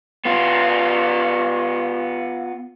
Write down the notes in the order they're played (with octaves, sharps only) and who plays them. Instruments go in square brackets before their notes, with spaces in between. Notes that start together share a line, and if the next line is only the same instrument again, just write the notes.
[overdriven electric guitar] B3 F4